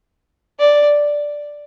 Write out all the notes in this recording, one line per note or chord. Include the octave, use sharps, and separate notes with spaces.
D5